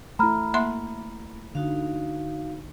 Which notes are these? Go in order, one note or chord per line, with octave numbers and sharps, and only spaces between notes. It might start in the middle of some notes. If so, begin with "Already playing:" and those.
A3 E4 A#5 B5 F6
A#3 E5 C6
D3 D#4 F#4 F5